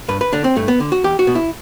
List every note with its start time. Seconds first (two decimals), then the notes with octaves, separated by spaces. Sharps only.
0.08 G2 B4
0.21 B4
0.33 D3 D4
0.44 C4
0.56 G2 A3
0.68 B3
0.80 D3
0.92 F#4
1.04 E2 G4
1.19 F#4
1.27 B2
1.35 E4